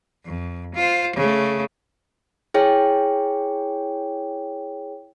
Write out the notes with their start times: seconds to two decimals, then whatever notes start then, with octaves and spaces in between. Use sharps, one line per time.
0.25 F2
0.75 F4 C5
1.16 C#3 A3
2.54 E4 G#4 C#5 G5